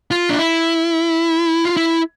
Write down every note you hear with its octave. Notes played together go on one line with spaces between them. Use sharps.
F4
D4
E4
F4
E4